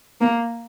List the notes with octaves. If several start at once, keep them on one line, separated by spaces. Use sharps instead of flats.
A#3